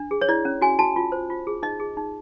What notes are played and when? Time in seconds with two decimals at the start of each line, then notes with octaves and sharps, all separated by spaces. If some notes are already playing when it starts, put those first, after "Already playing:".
Already playing: D4
0.11 G#4
0.21 C#5
0.29 E4 D5
0.45 C#4
0.61 F#4 G#5
0.79 F#4 A5
0.96 F4
1.12 C5
1.30 F4
1.47 G#4
1.63 D#4 D#5
1.80 G#4
1.97 D#4